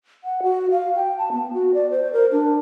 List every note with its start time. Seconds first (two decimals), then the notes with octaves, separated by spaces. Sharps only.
0.24 F#5
0.43 F#4
0.71 F5
0.95 G5
1.18 A5
1.32 B3
1.53 F#4
1.74 D5
1.91 C5
2.13 A#4
2.32 D4